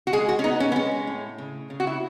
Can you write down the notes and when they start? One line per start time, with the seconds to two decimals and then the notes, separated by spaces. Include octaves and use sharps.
0.07 F#4
0.13 G#3 G#4
0.29 F#4
0.39 C#4
0.44 B3 D#4
0.60 C#4
0.72 B3
0.76 G#3 C#4
1.07 A2
1.38 C#3
1.70 C#3
1.80 F#4
1.87 E4